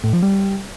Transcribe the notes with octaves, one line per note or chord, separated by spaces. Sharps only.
A2
F3
G3